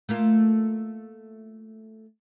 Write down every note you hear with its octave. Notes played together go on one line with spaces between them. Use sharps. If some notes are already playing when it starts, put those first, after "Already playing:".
A3 A#3 F4